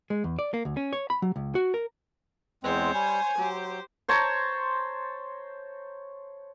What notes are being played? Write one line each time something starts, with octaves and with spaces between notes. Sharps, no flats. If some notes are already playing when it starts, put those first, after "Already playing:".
G#3
E2
D5
A#3
D2
C#4
C#5
B5
F#3
C#2
F#4
A#4
E2 G#3 C4 C5 C#5
G3 G#5
F#3 G4 C5
C5 C#5 A5 A#5